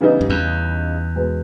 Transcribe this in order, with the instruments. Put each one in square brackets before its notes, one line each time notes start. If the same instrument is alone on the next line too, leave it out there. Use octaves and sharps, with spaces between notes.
[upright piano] C#3 E3 G3 B3 D#4
[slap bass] G2
E2
[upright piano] B2 G#3 B3